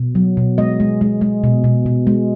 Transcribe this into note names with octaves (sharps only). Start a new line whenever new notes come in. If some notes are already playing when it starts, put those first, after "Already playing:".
Already playing: B2
F#3
B2
G#3 D#5
G#3
G#3
G#3
B2
B2
B2
G#3